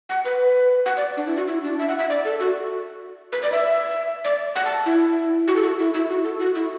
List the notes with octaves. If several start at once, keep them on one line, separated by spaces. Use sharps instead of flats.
F#5
B4
F#5
D5
D4
E4
F#4
E4
D4
E5
F#5
E5
D5
A4
F#4
B4
D5
E5
D5
F#5
A5
E4
F#4
A4
F#4
E4
E4
F#4
A4
F#4
E4